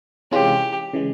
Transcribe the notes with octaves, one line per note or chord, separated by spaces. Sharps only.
C3 E3 G#3 C#4 F4 G4
C#3 E3 G#3